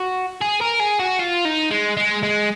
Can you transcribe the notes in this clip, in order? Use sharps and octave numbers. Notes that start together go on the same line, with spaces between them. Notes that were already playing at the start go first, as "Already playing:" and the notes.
Already playing: F#4
G#4
A#4
G#4
F#4
F4
D#4
G#3
G#3
G#3